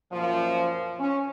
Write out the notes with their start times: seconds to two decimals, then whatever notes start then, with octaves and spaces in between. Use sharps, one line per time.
0.12 F#2 A#2 F3
0.99 C#4